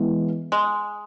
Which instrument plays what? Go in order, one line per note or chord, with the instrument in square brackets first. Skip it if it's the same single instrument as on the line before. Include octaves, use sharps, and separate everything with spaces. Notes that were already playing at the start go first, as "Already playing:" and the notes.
Already playing: [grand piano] E3 G#3 B3
[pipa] G#3